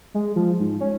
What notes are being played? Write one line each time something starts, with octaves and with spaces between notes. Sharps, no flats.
G#3
F3
G#2
C#4